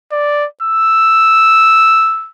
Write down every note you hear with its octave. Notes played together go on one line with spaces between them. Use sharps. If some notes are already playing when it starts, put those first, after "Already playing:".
D5
E6